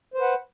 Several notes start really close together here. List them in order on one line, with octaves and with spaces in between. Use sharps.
C5 B4 F#5